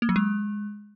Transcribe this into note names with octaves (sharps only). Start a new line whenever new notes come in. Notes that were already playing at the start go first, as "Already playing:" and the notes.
A#3
F#3
G#3